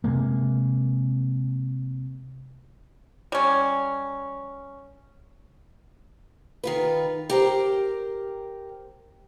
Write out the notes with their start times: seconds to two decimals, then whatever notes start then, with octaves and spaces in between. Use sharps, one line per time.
0.04 C3 G#3 A#3
3.32 G3 C#4
6.64 D#3 F4 B4
7.30 G4 A#4 C5